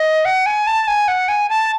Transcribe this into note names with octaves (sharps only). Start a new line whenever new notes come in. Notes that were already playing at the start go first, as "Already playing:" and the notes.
Already playing: D#5
F#5
G#5
A5
G#5
F#5
G#5
A5